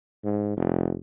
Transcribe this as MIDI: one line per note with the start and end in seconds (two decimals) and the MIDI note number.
0.24 0.53 44
0.57 0.96 29